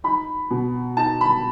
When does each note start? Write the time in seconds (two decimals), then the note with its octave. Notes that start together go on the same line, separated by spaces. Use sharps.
0.04 D#4 B5
0.51 B2
0.97 D#4 A5
1.21 B5